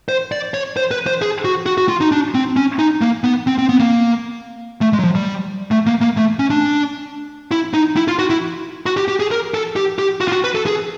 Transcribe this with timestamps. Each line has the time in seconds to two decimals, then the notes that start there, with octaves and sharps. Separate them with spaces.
0.09 C5
0.32 D5
0.54 C#5
0.77 C5
0.91 B4
1.07 C5
1.22 G#4
1.45 F#4
1.66 F#4
1.78 F#4
1.89 F4
2.01 D#4
2.12 D4
2.34 C4
2.56 C#4
2.79 D#4
3.01 A#3
3.24 B3
3.47 C4
3.58 C4
3.69 B3
3.80 A#3
4.81 A3
4.93 G#3
4.99 F#3
5.04 F3
5.15 G3
5.71 A3
5.87 A#3
6.01 A#3
6.17 A3
6.39 C#4
6.50 D4
7.51 E4
7.74 D#4
7.96 E4
8.08 F4
8.19 F#4
8.30 E4
8.86 F#4
8.97 G4
9.08 G4
9.20 G#4
9.31 A#4
9.54 A4
9.76 G4
9.99 G4
10.21 F#4
10.28 F4
10.32 F#4
10.44 B4
10.55 A4
10.66 G#4